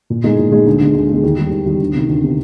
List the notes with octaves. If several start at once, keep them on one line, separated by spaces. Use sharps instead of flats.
A#2
G#3 D#4 G#4
A#2
G#3 D#4 G#4
D2
D3 G#3
D2
D3 G#3
D#2
D#3 G3
D#2
D#3 G3
D2
C3 D#3
D2
C3 D#3